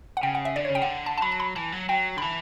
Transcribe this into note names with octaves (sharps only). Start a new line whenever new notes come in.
F#5
C#3 G5
F#5
E5
D3 D5
C#5
C#3
G5
D3 F#5
A5
A5
F#3 B5
A5
B5
E3 A5
F#3
F#3 G5
D3 B5
E3 A5